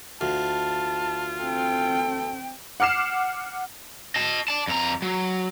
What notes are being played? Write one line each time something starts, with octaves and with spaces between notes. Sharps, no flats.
D2 F4 A5
C4 A4 G5
F#5 D6 F6 C7 E7
D#5 A5
D5 A5
F2 A#5
F#3